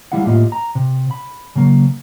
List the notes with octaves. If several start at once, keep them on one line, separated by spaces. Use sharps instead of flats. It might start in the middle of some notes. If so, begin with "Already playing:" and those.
G3 G#3 E4 F5 F#5
A2 A#3 F4 G4 D#5
A#5
C3
B5
C#3 F#3 A#3